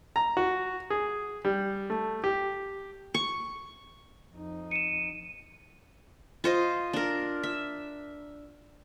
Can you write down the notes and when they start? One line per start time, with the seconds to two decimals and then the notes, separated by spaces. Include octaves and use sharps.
0.16 A#5
0.37 F#4
0.90 G#4
1.45 G3
1.90 A3
2.24 G4
3.14 C#6
4.33 F2 D#4
4.71 C#7 D#7 E7
6.44 F4 C5 D#5
6.93 D4 A#4
7.43 E5